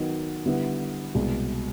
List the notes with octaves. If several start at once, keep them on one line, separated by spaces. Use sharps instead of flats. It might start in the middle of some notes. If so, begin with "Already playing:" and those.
Already playing: D#3 F#3 B3 D#4
D3 G3 B3 E4
C2 B2 G#3